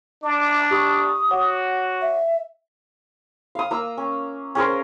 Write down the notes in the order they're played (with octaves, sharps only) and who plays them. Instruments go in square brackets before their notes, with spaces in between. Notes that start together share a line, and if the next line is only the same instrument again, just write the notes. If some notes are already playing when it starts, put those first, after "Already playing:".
[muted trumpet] D4 [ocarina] D6
[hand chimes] G4 B5 C#6 [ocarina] D#6
[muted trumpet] F#4 [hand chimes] C#5 F#5 D6
[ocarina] E5
[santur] F5 D#6
A#3 A#5 E6
C#4
C#4 G#4 A#4 C5